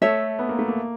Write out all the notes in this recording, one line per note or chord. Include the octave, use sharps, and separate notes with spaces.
A3 A4 C#5 E5
B3
A#3
A3
A#3